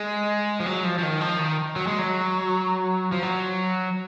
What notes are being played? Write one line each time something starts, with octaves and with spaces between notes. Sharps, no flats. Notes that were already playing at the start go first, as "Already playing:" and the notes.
Already playing: G#3
F3
F#3
F3
F3
D#3
F3
D#3
F#3
G#3
F#3
F3
F#3